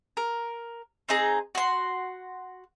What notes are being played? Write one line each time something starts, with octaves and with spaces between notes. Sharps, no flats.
A#4
C4 D#4 G#4 A#5
F#4 C6